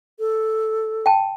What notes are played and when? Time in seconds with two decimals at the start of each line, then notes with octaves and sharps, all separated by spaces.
0.19 A4
1.06 G5 A5